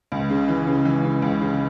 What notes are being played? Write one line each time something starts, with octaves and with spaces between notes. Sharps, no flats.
C#2
C#3
E3
C#3
E3
C#3
C#2
C#3